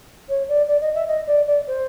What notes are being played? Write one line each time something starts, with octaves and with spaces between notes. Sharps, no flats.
C#5
D5
D5
D#5
E5
D#5
D5
D5
C5